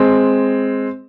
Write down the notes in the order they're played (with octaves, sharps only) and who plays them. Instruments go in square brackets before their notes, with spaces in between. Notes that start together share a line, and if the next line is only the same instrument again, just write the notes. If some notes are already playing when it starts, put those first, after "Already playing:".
Already playing: [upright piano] G#3 C4